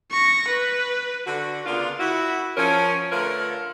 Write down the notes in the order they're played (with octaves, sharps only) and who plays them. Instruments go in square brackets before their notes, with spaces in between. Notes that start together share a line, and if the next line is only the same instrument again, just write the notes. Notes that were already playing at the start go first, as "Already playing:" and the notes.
[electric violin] C#6 A#6
B4
[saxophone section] D3 F#4
C#3 A#3 B3 D4 F4
E4 F#4
F3 C#4 A#4
D3 A3 F4 A#4 B4 C#5